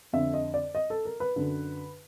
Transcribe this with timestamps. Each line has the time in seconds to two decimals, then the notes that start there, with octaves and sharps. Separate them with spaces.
0.13 F2 D3 E5
0.34 D#5
0.54 D5
0.75 D#5
0.90 A4
1.05 A#4
1.20 B4
1.36 F#2 D3